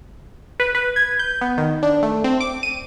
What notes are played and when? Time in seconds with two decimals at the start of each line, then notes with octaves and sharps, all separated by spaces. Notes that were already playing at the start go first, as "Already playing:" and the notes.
0.60 B4
0.75 B4
0.96 G#6
1.19 G6
1.41 B3
1.58 D#3
1.83 D4
2.03 A3
2.24 C4
2.41 D6
2.63 D#7